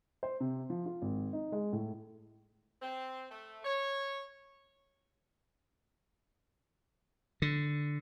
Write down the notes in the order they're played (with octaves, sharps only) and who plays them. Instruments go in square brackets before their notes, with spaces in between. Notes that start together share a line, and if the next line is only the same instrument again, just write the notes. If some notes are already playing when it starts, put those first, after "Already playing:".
[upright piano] C5
C3
F3
F4
G#1
D#4
G#3
A2
[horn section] C4
A3
C#5
[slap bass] D3